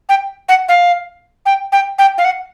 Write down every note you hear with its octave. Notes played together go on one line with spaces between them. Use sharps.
G5
F#5
F5
G5
G5
G5
F5
F#5